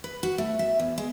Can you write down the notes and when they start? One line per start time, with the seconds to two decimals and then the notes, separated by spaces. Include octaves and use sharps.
0.04 B4
0.23 F#4
0.38 A3
0.59 E5
0.79 E2
0.98 G#3